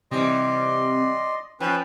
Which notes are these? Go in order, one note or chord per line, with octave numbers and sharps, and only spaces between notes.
C3 E3 G3 D5 D#5 C6
F3 C#4 B4 G5